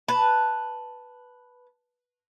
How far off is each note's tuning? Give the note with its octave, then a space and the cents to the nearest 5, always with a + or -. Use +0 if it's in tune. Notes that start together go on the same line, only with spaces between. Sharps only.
B4 +0 A5 +0